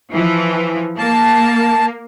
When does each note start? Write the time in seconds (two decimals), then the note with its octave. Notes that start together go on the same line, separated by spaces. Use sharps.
0.11 E3 F3
0.98 A#3 A5